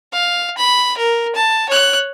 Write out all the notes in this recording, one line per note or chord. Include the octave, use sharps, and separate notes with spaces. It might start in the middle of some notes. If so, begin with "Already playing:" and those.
F5
B5
A#4
A5
C#5 F#6